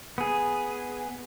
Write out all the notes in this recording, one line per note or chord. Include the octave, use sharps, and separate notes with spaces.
B3 G#4